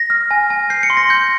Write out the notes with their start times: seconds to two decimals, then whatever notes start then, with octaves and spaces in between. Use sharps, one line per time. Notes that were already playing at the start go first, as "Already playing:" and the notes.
Already playing: A#6
0.10 F6
0.31 G#5
0.50 G#5
0.70 G6 C7
0.83 C#7
0.90 C6
0.97 A#6
1.10 G6